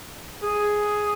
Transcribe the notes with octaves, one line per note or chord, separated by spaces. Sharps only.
G#4